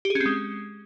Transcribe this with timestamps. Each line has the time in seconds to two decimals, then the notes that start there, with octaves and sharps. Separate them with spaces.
0.05 G4
0.10 G#4
0.15 C#4
0.20 C4
0.26 G#3